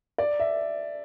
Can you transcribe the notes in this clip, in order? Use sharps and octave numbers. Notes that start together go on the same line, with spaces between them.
D5
E5